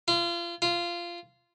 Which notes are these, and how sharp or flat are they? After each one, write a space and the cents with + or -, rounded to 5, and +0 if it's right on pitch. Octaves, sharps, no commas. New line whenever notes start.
F4 -30
F4 -15